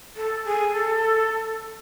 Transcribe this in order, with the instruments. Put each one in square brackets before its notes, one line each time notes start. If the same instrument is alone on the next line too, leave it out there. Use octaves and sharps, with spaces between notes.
[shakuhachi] A4
G#4
A4